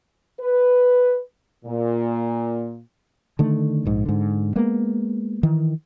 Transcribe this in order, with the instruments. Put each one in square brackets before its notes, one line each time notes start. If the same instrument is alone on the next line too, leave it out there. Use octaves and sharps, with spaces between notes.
[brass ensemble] B4
A#2
[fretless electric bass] D3 D#3 A3
A#1 G#2
G#2 D3
G#3 A#3 B3
D#3 E3